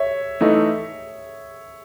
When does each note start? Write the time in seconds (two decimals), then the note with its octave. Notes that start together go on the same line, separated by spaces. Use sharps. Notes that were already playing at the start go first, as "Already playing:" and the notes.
Already playing: C#5 E5
0.41 E3 A3 D#4